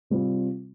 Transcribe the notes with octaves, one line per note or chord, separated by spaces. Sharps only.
C3 G3 C4 F4